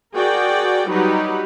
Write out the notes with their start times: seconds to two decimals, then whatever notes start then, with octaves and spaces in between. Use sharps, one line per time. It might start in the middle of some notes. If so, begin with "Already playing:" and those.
0.15 F#4 G#4 A#4 D5 G5
0.89 F#3 G3 D#4 G4 B4